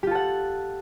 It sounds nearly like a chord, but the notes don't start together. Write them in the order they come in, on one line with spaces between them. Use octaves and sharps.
G4 F4 A4 F#5